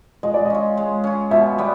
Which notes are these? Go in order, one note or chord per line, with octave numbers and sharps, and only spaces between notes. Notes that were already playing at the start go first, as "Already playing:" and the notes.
G#3 D#5
D5
D#5
C#4 F4
G#3
C#4 F4
B2 E5
G3 B3